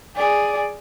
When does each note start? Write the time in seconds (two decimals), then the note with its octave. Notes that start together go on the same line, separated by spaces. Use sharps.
0.16 G#4 D5